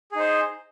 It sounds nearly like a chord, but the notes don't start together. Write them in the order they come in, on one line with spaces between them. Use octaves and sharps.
G#4 D#4 C5